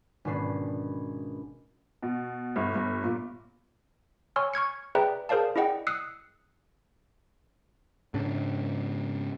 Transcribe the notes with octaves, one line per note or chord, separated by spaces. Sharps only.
G#1 B2 C#4 D4 B4 C7
B2
G1
G1
A#2
C#5 G#5 C6 C#6 E6 F6
C#6 F6 G#6 C#7
G#4 B4 D5 E5 G5 A#5
G#4 A#4 C5 D5 F5 A5
E4 G#4 D5 D#5 F#5 G5
D#6 E6 F#6 C7 C#7
G#2 C#3 D4